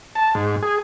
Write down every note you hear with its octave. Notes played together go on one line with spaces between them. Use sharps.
A5
G#2
G#4